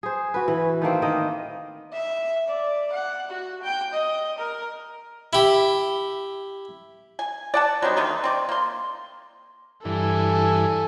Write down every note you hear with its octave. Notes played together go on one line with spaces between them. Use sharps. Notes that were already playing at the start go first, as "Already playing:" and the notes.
G#4 C5
F#4 B4
E3
D#3 A3 A#3 C4
D#3 D#5
E5
D5
F#5
F#4
G5
D#5
A#4
E4 G4
G#5
D5 F#5 A5
F#3 G3 C4 D#4
D3 D#3 A3 D#4
C4 D5
A#3 C6
G2 E3 A4 G#5